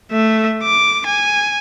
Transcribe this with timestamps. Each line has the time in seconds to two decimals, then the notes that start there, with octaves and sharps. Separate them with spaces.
0.11 A3 E5
0.63 D6
1.06 G#5